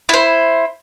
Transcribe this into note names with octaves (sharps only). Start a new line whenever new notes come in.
E4 C5